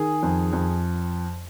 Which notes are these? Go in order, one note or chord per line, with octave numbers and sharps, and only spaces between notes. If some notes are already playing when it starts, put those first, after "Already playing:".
Already playing: D#3 G#4
F2
F2